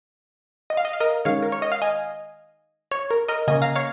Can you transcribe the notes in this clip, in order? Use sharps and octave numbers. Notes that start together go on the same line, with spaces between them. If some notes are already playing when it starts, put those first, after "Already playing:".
D#5
F5
D#5
F5
A#4 D#5
D#3 G#3 C#4 C#5 F5
A#4
C#5
D#5
F5
D#5 G#5
C#5
A#4
A#4 D#5
C#3 A#3 C#4 D#5 G#5
F5 A#5
C#5 F5